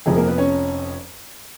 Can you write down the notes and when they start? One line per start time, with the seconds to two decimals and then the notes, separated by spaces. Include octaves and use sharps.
0.06 F1 F2 F3 G#3 G#4
0.16 A#3 A#4
0.27 B3 B4
0.38 C#4 C#5